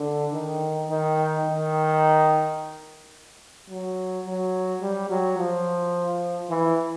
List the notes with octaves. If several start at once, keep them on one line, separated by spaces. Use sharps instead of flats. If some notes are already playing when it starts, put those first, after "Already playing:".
Already playing: D3
D#3
D#3
D#3
F#3
F#3
G3
F#3
F3
E3